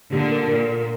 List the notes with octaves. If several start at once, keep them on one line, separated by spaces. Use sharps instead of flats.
A#2 D3 G4
A#4
A#2 A#4
A#4